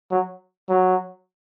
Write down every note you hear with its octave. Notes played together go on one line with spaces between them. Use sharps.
F#3
F#3